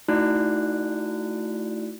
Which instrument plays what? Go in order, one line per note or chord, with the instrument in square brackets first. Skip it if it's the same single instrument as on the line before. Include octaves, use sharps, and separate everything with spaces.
[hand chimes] A3 D#4 E4 F#4 D5 F#6